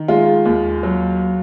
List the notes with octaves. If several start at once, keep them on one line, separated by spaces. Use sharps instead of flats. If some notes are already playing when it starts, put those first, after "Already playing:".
Already playing: D#3
G#3 F4
D#2
F#3